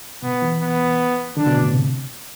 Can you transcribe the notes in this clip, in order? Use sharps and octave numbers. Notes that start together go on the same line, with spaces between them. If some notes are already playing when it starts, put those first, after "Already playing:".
B2 B3
E3
B3
D3 D4
B2
A2
C3